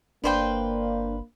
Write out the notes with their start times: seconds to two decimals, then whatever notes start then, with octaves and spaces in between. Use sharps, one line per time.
0.24 G1 A#3 D4 B4 C5 D5 F5 G5